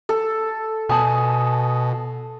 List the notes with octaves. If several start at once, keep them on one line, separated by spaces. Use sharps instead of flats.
A4
B2 G#5 A5 D#6